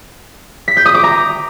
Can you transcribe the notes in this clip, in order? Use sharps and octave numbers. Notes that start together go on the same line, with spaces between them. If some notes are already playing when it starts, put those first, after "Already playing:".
B6
G6
D#6
D6
A#5